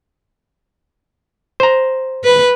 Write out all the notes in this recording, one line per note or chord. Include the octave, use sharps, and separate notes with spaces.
C5 A#5
B4